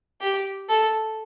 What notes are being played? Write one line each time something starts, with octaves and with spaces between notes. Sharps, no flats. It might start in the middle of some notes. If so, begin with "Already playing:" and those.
G4
A4